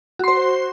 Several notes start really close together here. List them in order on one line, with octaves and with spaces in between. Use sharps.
F#4 C6 C5